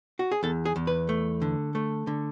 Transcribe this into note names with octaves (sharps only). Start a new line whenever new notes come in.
F#4
G#4
E2 A4
G#4
E2
B4
A3
D3
A3
D3